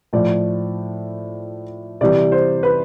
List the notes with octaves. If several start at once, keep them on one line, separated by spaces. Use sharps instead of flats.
A2 F3 D5
C3 E3 G3 D5
C5
B4